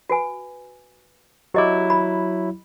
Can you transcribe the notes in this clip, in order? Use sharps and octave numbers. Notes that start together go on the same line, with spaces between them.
F#4 B4 G#5
F#3 E4 G4 D#5 D6
B5